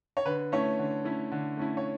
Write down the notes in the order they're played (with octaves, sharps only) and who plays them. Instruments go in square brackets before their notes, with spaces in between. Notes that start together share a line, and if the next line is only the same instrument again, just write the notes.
[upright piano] C#5
D3 B4
A3 C#4 E4 C#5
D3
A3 C#4 E4
D3
A3 C#4 E4
C#5